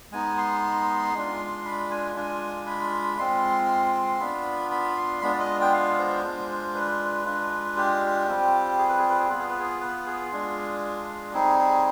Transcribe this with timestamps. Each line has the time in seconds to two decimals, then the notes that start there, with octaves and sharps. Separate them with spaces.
0.12 G#3 B3 D#4 G#5
0.38 C6
1.14 G#3 D4 F4
1.65 B5
1.91 G#5
2.16 G#3 D4 F4 G#5
2.67 B5
3.18 G#3 C4 F4 C6
4.20 B3 D4 F4 B5
4.71 B5
4.97 C6
5.22 G#3 B3 D4 F4 B5
5.34 D5
5.39 D#5
5.61 G5
5.73 F5
5.98 C5
6.24 G#3 D4 F4
6.75 B4
7.26 G#3 D4 F4
7.77 G4
8.28 G3 C4 F4
8.79 G#4
8.89 B4
8.98 G#4
9.09 B4
9.19 G#4
9.29 B3 F4 B4
9.39 G#4
9.50 B4
9.60 G#4
9.81 B4
10.06 G#4
10.31 G#3 D4 F4
11.34 G3 C4 D#4 G#4
11.59 G#4